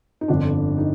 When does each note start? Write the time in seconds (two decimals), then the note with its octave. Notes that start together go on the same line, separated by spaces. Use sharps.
0.21 D#4
0.28 G1 F2 D3 D4
0.78 D#4